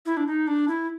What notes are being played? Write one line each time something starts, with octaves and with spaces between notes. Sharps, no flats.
E4
D4
D#4
D4
E4